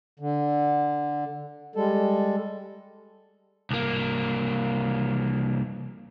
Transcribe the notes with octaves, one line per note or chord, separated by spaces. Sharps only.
D3
G3 G#3 A4
C2 A#3